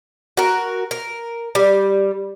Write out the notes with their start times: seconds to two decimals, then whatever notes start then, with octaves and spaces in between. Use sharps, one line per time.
0.37 F#4 A#4
0.91 A#4
1.55 G3